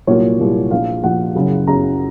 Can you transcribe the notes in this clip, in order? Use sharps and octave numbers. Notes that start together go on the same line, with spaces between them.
C2 A#2 F#3 A#3 C#5
C2 A#2 F#3 A#3
A#1 A#2 F3 F5
A#1 A#2 F3 F#5
F#1 F#2 C#3
F#1 F#2 C#3 A#5